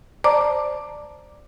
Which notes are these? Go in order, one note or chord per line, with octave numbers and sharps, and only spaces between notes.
C5 D5 A5 A#5 D6